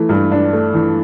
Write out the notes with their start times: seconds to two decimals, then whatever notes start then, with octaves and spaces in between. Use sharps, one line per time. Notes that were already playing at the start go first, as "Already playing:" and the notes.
Already playing: E3 A3
0.09 G2
0.32 D4
0.53 A3
0.74 E3